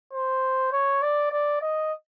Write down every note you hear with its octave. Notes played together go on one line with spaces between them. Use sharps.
C5
C#5
D5
D5
D#5